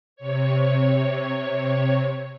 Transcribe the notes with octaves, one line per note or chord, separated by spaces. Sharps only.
C3 C#5